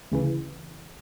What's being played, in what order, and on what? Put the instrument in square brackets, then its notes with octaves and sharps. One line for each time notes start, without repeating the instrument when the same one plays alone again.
[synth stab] D2 C#3 E3